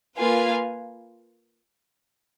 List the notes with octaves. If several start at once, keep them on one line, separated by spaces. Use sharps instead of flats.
A#3 F4 B4 F5 G#5